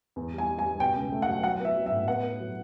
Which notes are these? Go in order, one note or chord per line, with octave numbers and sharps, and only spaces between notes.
E2
G3
G#5
G3
G#5
G3
B2 G5
C#2
A3
F#5
F#3
F#3 F#5
B3 E5
F#3
E5
A2
B3 F#5
B3
F#3